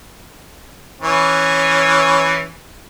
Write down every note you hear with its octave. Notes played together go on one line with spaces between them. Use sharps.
E3 C#4